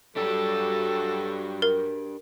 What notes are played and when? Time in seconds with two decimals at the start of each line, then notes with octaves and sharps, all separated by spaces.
0.16 F#3 G3 D4 F#4 G4 A4
1.62 A#4